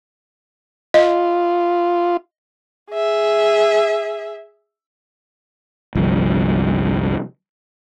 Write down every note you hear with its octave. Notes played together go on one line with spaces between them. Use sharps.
F4 D#5
G#4 E5
G1 C2 F3